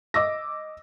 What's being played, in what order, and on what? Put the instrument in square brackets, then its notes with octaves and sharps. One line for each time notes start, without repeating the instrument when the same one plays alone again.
[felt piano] D#5 D6 E6 A#6